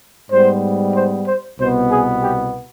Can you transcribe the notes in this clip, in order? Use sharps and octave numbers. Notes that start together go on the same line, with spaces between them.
G#2 G3 B3 C5
C5
C5
C2 B2 B3 C5
G#4
G4